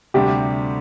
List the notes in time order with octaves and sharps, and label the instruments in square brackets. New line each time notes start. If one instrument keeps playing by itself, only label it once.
[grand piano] D2 C3 G3 D4 [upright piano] G4